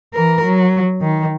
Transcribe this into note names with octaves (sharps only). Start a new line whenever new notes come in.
E3 A#4
F#3
D#3